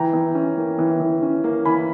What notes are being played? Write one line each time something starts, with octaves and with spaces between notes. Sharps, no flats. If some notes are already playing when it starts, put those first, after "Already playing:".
Already playing: E3 G5 A#5
E3
C#4
A#3
E3
E3
C#4
A#3
E3 G#5 B5